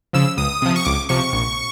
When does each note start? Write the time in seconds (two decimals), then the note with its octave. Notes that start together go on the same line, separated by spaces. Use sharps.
0.13 C#3 F3 E6
0.37 C#2 D#6
0.62 C3 F3
0.76 C#6
0.85 C#2 D6
1.09 C3 F3 C#6
1.33 A#1